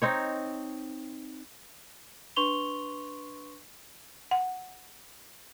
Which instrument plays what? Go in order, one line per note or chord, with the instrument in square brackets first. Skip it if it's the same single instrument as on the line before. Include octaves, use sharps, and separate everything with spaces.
[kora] C4 D#4 C#5
[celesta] D4 B4 C6 C#6 F7 G7
[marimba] F#5